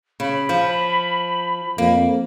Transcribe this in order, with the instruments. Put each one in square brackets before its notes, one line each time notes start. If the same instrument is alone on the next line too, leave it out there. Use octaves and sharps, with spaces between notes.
[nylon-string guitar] C#3 [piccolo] B5
[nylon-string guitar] F3
[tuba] F2 [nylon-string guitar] A#3